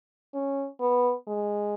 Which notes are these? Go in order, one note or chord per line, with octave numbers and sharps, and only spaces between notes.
C#4
B3
G#3